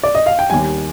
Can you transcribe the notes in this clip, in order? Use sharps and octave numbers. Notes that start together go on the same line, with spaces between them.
D5
D#5
F5
G5
D#2 D#3 G3 G#5